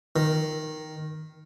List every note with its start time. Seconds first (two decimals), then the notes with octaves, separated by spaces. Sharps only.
0.16 D#3